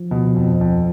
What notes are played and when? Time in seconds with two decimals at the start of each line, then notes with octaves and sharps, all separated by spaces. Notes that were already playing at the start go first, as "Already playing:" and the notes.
Already playing: F3
0.11 B2
0.36 F2
0.61 F2